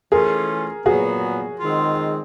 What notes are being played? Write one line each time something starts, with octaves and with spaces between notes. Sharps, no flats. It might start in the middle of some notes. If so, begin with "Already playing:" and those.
E3 A3 C#4 F4 G#4 A#4
A#2 F#3 B3 F#4 G#4
D#3 G#3 C4 F4